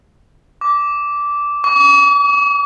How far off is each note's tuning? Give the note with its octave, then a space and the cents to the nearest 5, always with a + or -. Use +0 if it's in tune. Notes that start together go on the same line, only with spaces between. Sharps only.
D6 -10
D6 -45